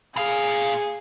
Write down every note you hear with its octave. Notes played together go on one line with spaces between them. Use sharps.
A#2 G#4 F5